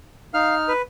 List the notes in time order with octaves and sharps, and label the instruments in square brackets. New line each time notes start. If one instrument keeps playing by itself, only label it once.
[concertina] D#4 F6 [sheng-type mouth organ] F5
[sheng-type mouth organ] B4